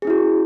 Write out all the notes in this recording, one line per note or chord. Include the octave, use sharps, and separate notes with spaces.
C#4 E4 F#4 G#4